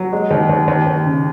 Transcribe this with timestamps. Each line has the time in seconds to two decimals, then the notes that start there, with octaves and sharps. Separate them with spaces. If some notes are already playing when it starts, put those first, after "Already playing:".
Already playing: F#3
0.13 G#3
0.31 D#2
0.49 D#2
0.68 D#2
0.87 D#2
1.06 C#3